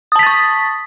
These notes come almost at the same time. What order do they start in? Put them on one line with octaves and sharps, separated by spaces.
D#6 A5 B6 A6 C#6